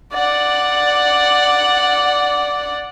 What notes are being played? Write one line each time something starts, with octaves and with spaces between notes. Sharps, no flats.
D5 F#5